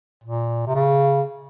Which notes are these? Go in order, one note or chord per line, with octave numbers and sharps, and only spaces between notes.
A#2
C3
C#3